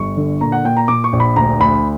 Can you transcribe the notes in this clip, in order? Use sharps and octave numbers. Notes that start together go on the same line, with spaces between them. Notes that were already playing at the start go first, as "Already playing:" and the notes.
Already playing: G1 C#6
D3
A#2 A#5
F#5
A#2 G5
A#5
A#2 D6
C#6
A#1
B5
D2 A#5
D2 B5